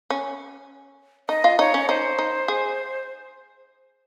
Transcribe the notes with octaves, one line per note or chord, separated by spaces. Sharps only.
C#4
D#4 D#5
F4
D#4 C#5
C#4
D#4 C5
D#4
G#4